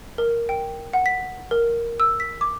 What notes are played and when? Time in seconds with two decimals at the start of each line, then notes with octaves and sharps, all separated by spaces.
0.18 A#4
0.49 G5
0.93 F#5
1.06 B6
1.51 A#4
2.00 E6
2.20 B6
2.41 D6